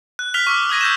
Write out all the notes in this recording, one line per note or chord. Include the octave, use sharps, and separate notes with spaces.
F#6
F6 B6 F7 G7
C#6 D6 E6
D#6 F6 G#6 A#6 D#7
E6 G6 E7